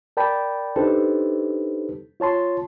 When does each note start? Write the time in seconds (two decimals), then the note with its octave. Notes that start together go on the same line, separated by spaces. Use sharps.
0.17 A#4 D5 G5 A5 B5
0.76 D4 D#4 G4 A4 B4 C5
2.20 F4 C#5 A5 C6